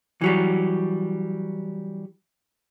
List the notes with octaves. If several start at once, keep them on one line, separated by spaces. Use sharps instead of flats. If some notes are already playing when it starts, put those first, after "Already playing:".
E3 F#3 G3